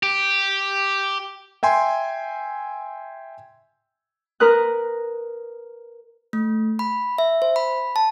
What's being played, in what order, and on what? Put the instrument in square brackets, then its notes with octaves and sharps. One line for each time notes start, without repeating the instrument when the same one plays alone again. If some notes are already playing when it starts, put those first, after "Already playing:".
[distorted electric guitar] G4
[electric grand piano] E5 G5 G#5 C6
[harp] A#4 B4 D#6 F#6
[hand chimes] A3
B5
E5
C5
B5
A5